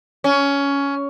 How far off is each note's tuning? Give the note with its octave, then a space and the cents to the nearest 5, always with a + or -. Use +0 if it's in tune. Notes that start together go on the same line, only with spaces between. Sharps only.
C#4 +15